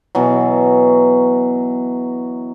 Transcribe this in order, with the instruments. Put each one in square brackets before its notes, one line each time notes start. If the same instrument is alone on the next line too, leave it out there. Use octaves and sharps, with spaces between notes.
[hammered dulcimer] B2 E3 F#3